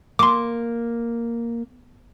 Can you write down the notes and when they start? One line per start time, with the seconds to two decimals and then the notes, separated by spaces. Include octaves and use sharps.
0.19 A#3 C6 D6